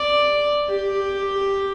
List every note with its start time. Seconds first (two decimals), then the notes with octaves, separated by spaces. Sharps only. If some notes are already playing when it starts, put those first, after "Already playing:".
Already playing: D5
0.69 G4